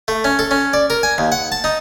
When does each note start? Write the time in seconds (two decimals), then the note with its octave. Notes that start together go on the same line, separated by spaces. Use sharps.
0.08 A3
0.24 C#4
0.39 A4
0.51 C#4
0.73 D5
0.90 A#4
1.03 G#5
1.18 D#2
1.32 F#5
1.52 A5
1.64 D#4